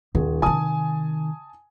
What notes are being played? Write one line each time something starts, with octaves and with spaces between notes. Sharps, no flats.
D#1 D#2 G#4
C3 D#3 G#5 A5 D#6